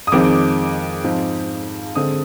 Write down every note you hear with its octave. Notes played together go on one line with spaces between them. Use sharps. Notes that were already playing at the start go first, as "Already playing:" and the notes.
D#6
F2 D#3 G#3 C4 D6
G#2 F3 C4
D3 G#3 C4 D#6